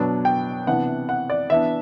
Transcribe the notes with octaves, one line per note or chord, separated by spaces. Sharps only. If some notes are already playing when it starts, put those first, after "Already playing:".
Already playing: B2 F#3 B3 D4
G5
C3 E3 B3 D4 F#5
F#5
D5
E3 B3 D4 E5